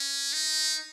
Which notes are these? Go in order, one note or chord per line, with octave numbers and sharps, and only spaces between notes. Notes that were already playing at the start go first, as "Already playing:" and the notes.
Already playing: C#4
D#4